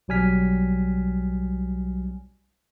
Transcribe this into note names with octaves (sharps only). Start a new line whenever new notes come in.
B1 F#3 G3 G#5 F6 B6